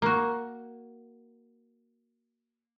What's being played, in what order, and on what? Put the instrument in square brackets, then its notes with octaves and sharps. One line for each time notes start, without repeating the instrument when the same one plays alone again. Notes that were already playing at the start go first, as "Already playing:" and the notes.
[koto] A#3 F#4